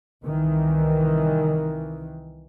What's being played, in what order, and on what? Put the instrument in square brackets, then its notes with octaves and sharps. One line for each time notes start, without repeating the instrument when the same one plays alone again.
[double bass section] C2 D#3 E3